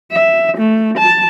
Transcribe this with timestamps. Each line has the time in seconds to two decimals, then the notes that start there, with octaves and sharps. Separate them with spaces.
0.12 E5
0.57 A3
0.97 A5